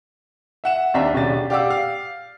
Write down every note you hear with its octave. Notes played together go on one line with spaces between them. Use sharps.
E5 F#5 E7
D#2 C4 D4 E5 A#5 B6
B1 C#3 D4 G4 A6
G4 D5 F5 F#5 D6 E6
F5